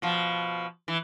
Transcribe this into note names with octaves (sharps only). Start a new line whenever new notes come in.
B2 F3
E3